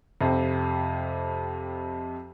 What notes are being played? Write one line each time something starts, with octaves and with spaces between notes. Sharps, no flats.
F2 C3